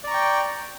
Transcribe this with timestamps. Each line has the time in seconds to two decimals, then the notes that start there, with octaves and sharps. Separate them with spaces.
0.04 D5
0.07 A#5
0.11 C#6
0.14 G5